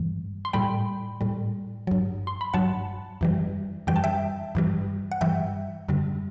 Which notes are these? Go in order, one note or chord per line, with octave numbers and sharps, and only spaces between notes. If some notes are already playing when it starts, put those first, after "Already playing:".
Already playing: G2 E3 G3
C6
A2 G3 G5 B5
A2 G3
G2 F#3
C6
B5
G2 F#3 F#5 A5
F#2 E3 G3
F#2 E3 G3 G5
A5
E5 G5
G2 E3 G3
F#5
G2 E3 G3 E5 G5
F#2 D3 G3